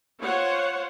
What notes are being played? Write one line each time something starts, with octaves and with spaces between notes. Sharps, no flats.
F4 C5 C#5 F#5